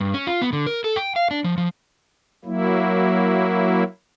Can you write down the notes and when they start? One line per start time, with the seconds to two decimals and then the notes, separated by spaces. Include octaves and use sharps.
0.01 G2
0.14 C#4
0.27 F4
0.42 B3
0.53 D3
0.66 A#4
0.84 A4
0.96 G5
1.16 F5
1.31 D4
1.44 F3
1.58 F3
2.45 F#3 A#3 E4